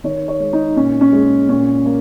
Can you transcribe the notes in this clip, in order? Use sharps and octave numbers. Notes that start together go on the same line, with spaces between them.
D#3 C#5
C#5
G#3
D#4
A#2 C#4
C#4
G#3
A#2 C#4
A#3